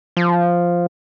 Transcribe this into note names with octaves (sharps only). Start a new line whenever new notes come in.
F3